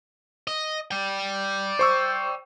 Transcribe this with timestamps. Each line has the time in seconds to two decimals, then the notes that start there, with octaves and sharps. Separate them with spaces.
0.47 D#5
0.91 D5 G5
1.79 C5 C#6 E6